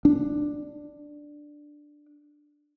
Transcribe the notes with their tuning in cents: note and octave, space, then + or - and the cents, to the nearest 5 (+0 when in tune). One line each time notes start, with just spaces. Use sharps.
D4 +5